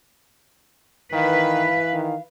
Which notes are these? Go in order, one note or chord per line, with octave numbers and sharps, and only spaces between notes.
D#3 E3 B4 F5
D#3